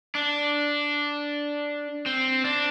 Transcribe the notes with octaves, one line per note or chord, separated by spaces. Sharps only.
D4
C4
D4